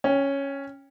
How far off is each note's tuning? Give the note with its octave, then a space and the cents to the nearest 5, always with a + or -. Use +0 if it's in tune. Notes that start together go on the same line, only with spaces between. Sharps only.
C#4 +0 G5 +30